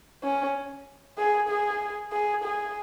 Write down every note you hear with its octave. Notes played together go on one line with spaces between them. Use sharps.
C#4
G#4
G#4
G#4
G#4